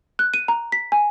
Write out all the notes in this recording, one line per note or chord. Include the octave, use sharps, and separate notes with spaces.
F#6
D#7
A#5
B6
G#5